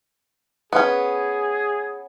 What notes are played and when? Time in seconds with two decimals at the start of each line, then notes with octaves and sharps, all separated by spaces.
0.73 B3 C#4 G#4